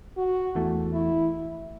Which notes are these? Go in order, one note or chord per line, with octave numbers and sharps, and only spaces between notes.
F#4
E2 E3 A3
E4